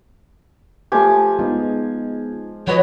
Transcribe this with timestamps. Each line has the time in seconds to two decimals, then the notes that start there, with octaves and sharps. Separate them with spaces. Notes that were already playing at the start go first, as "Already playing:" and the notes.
0.92 F3 A3 G4 G#5 D6
1.39 G#3 B3 D#4 F4
2.67 F3 F#4 B4 C#5 D#5